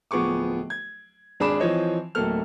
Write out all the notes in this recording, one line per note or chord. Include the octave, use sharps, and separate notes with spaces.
D1 F3 B3 G#4 C#6 D6
G#6
G#1 D4 G#4 B5 D6 E7
E3 F3 C4 C#5 D#5
D1 F#3 A3 A#3 A4 F6